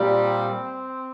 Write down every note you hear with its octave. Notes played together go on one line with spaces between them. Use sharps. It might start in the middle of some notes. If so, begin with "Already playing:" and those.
Already playing: A#2 G3 C4